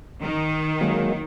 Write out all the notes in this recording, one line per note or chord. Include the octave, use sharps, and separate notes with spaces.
D#3
F#3 G#3 A#3